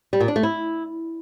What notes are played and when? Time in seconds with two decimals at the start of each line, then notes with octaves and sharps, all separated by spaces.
0.13 G3
0.20 A#2
0.28 D4
0.36 A3
0.43 E4